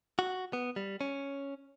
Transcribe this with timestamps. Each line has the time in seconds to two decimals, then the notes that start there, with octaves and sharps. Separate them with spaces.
0.19 F#4
0.53 B3
0.76 G3
1.01 C#4